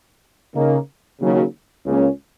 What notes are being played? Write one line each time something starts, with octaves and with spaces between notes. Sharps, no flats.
C#3 A#3 D#4
D#2 C#3 F#3
C#2 C#3 A#3 C#4